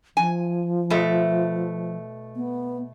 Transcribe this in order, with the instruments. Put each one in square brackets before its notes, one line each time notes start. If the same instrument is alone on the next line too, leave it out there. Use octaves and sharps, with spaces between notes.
[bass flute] F3 [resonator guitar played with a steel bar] G#5
[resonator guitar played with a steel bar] B2 A3
[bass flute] B3